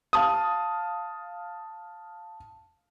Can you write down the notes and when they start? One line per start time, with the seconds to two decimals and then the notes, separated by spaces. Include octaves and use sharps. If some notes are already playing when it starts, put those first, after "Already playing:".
0.13 F5 A5 D#6